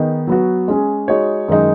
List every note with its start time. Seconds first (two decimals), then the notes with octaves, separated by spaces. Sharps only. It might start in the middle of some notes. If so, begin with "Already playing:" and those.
Already playing: D#3 B3 D#4 G#4
0.27 F#3 B3 F#4
0.68 G#3 C#4 G#4
1.08 G#3 D#4 F#4 C#5
1.48 F#2 D#3 G#3 D#4